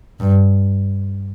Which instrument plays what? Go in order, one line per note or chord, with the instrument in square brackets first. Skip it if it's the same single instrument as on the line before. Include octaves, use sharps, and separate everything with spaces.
[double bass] G2